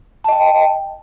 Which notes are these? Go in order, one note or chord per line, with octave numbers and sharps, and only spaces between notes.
D#5 G5 A5